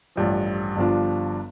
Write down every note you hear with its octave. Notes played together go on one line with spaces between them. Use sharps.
A1 G2 F3
G1 G2 F3 D4 F4